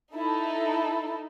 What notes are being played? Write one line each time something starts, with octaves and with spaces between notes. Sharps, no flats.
D#4 E4 A4